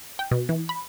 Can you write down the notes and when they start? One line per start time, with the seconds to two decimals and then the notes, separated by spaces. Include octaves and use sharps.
0.19 G5
0.31 B2
0.49 E3
0.69 B5